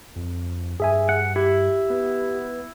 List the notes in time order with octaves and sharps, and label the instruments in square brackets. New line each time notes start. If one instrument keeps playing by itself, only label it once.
[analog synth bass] F2
[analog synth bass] G2 [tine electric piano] G#4 E5 G#5
[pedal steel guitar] F#5
[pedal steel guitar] E4 [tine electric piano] G4
[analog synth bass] B3